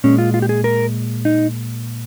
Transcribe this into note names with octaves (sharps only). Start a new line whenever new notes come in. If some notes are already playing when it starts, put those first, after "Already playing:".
A#2 G#3 C#4
F4
F4
G4
G#4
A#4
D#4